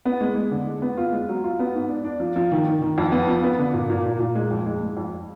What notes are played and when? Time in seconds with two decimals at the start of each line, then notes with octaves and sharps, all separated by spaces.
0.05 B3
0.21 G#3
0.35 G#3
0.51 D3
0.66 G#3
0.82 B3
0.97 F4
1.12 G#3
1.29 F#3
1.44 F4
1.59 B3
1.74 G#2
1.89 D4
2.04 D4
2.20 F3
2.36 F3
2.52 D#3
2.66 D#3
2.82 D#3
2.98 F2
3.12 B3
3.27 F3
3.43 B3
3.59 D3
3.74 A#2
3.90 A#2
4.05 A#2
4.20 A#2
4.35 G#3
4.51 F2
4.66 G#3
4.81 G#3
4.97 F2